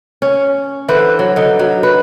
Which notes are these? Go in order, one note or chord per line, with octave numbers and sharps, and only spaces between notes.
C#4
D3 E3 B4 C5
F#3
D3 D#4
F#3
B4